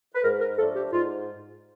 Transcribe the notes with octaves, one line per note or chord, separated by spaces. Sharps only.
B4
G#2 A#4
A#4
F3 A3 D4 A4
G4
G#2 F4